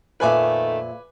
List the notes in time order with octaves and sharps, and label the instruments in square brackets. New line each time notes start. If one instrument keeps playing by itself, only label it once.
[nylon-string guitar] F2 A#2 E5 [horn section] D#3 A3 [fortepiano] B4 G#5 D6